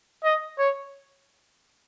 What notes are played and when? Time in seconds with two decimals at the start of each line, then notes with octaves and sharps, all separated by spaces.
0.24 D#5
0.58 C#5